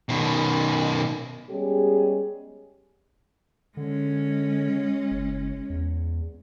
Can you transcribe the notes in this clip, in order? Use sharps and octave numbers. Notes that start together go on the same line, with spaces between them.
B2 D#3
G3 G#3 B3 C#4 G4 G#4
D3 G#3 C#4
F#1
E2